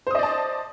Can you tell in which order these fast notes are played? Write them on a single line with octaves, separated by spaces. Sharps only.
C5 D#6 D#5 D5 A5